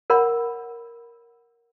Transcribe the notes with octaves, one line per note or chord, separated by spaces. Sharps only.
A#4 C#5 F#5 B5